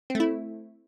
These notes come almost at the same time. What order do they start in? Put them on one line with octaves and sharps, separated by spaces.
C4 A3 E4